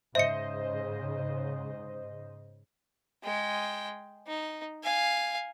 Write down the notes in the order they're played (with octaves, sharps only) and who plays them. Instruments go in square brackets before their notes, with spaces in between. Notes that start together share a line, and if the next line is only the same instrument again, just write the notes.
[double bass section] G#2 C#3 [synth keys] C5 D#5 [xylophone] E5 C#7
[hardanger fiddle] G#3 G5
D#4
F5 G#5